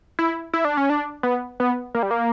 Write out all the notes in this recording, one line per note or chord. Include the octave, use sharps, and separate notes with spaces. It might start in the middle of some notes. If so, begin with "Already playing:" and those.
E4
E4
D4
C#4
D4
B3
B3
A#3
G3
A#3